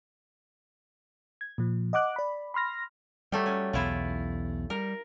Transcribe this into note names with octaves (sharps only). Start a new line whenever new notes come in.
G#6
A#2 F3
D#5 F#5 D6 F#6
D5 B5
B5 C6 F6 A#6
F#3 G3 A3 G4
C#4
B1 E2 E4 F4
G3 A#4